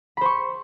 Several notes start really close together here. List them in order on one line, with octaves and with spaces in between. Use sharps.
B5 C5 C#6